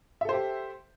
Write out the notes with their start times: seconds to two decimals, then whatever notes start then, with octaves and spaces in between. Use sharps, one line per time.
0.21 E5
0.25 A4
0.29 C5
0.33 G4